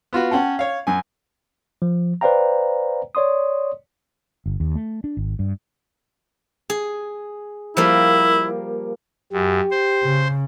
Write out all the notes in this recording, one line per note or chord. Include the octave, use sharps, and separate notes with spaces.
B3 F4 F#4
C#4 F#5 G5 A5
C#5 F5
F#2 G#5
F3
B4 C5 D5 F5 G5 A#5
C#5 D5 C6 D#6
G1
D#2
A3
D4
G#1
G2
G#4
F3 G3 A#3 E4
F#2 G4
C5
C#3